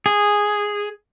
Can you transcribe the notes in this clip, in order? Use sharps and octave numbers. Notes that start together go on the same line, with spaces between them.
G#4